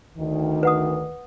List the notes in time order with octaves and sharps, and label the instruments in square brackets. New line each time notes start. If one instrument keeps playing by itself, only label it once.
[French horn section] D2 D#3
[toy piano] B4 F#5 D#6